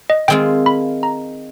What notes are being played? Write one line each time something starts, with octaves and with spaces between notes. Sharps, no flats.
D#5
D#3 G#3 C4 F4 G5
B5
A#5